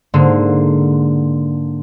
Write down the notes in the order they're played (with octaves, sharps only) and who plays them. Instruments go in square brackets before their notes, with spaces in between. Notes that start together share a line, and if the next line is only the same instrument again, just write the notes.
[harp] G#2 D3 A#3